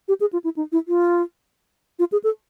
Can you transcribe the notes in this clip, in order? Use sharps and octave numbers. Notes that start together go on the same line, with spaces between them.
G4
G#4
F4
E4
D#4
E4
F4
F4
G#4
A4